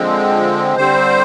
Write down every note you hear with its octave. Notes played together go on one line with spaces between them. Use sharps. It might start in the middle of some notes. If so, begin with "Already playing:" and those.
Already playing: D3 F3 G#3 C4
D3 G3 C4 C5